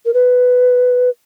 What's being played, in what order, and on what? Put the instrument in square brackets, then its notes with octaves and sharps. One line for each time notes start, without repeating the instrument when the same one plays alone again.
[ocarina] A#4
B4